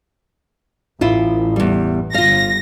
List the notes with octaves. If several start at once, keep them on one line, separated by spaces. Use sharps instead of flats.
A1 E4 F4
E2 G3
G1 F4 F5 A#6